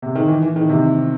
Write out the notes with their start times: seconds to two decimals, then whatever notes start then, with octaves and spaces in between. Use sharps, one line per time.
0.02 C3
0.15 D#3
0.28 E3
0.42 E3
0.56 D#3
0.69 C3